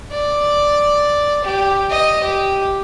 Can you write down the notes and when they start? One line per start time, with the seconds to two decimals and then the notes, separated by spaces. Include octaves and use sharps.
0.12 D5
1.44 G4
1.90 D#5
2.24 G4